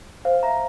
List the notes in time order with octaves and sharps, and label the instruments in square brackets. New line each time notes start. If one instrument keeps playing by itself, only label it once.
[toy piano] C5 [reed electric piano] F5
[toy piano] E5 A#5